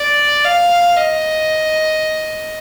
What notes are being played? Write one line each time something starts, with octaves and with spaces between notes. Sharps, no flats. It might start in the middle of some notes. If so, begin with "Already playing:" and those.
Already playing: D5
F5
D#5